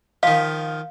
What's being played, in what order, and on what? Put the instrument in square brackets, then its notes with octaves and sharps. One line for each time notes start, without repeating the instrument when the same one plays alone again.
[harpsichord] D#3 F3 [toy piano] F5